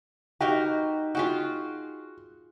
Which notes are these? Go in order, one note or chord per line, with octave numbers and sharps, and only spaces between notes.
D#4 F#4 G4 A#4 B4
F4 F#4 G#4 G5